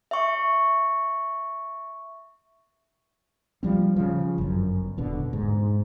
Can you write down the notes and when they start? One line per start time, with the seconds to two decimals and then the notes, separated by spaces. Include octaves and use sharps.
0.11 E5 C#6
3.63 F3 G3 C4
3.96 C#3 F3
4.38 G1 F#2
4.97 E1 B2 D3
5.33 G#2